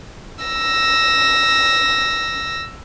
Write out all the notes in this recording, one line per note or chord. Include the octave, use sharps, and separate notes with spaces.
E6 A#6